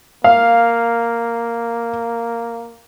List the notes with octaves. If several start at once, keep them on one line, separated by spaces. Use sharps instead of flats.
A#3 F5